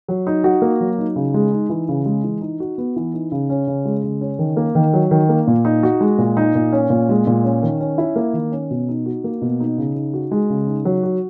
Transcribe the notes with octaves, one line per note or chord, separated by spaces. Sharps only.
F#3
D#4
F#4
A#3
F#3
D#4
C#3
G#3
D#4
E3
C#3
G#3
E3
D#4
F#4
B3
E3
D#4
C#3
C#4
C#3
G#3
C#3
C#4
D#3
A#3
D#3
F#3
D#3
A#3
A#2
D#4
F#4
G#3
A#2
D#4
A#2
C#4
A#2
G#3
A#2
C#4
D#3
C#4
E4
A#3
D#3
C#4
B2
D#4
F#4
A#3
B2
D#4
C#3
D#4
F#4
G#3
C#3
D#4
F#3
F#4